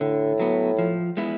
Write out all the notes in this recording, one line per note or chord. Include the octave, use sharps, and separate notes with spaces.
A2 D3
F#3 B3
F3
G#3 B3 E4